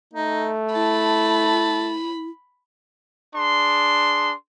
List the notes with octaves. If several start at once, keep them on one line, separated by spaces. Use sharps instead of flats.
A3 D#4
E4 A5 B5
D4 G#4 C6